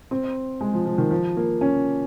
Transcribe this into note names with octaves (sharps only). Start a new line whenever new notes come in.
C4
G#3
F3
F3
D#3
F3
A#3
C#4